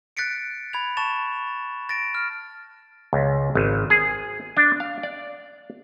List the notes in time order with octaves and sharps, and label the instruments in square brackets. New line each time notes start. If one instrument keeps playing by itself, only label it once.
[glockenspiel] F#6 A6 B6 C#7 D7
B5 G#6 F7
A5 C#6 A6 E7
A6 A#6 D7
F6
[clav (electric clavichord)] C#2
G#1
G#4
D4
F5
D5